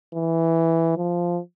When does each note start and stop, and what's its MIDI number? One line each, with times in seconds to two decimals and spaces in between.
0.14 0.94 52
0.97 1.40 53